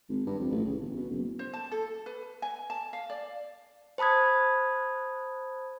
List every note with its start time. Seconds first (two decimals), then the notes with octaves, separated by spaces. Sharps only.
0.09 G#1
0.26 G2
0.39 F2
0.51 A1
0.65 C#3
0.80 G1
0.97 B2
1.10 F#1
1.39 C5
1.54 A5
1.72 A4
2.06 B4
2.42 G#5
2.70 A5
2.93 F5
3.10 D5
3.98 C5 A5 B5 D#6 G#6